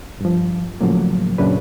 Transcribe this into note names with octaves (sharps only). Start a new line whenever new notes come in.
G2 F3
A2 C#3 F3 F#3 A#3
F#2 A#2 C#3 D4 B4